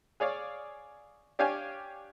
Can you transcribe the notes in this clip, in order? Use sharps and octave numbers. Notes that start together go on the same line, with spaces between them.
G#4 C#5 D5 F5
D4 G4 C#5 F5 G5 G#5